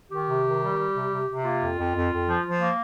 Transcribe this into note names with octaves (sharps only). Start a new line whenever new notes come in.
D#3 G4
C3
D#3
G3
G3
C3
C3
C3
A#3 F4
F2
F2
F2
F2
F3
F3
A#3